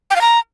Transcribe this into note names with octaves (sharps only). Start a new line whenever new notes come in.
G5
F5
A#5